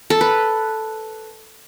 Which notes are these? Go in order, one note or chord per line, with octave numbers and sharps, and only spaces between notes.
A4
B4